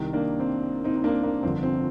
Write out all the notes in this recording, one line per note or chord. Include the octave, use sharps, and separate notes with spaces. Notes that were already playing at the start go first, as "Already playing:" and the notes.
Already playing: C2 C3 D#3
A#3 D4
C4
C4 D#4
D#4
A#3 D4
A#3
G1 F2 D3 C4
C4